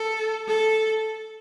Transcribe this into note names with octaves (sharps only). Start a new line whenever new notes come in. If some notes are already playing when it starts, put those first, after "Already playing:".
Already playing: A4
A4